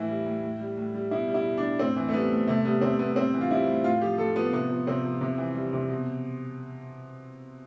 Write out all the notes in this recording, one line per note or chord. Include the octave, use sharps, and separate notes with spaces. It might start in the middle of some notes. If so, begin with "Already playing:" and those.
Already playing: A2 E3 E4
G3
A2
A2
G3
A2
G3
B2 E4
G3
E4
B2
D4
G3
A2 C4
E3
A3
G3 B3
A2
C3 A3
G3 B3
C3 C4
G3 B3
A2 C4
E3
F4
G3 E4
A2
A2 F4
F3 G4
A2 A4
F3 B3
C3 B3
F3
C3 C4
F3
C3
E3
G3
C3
B2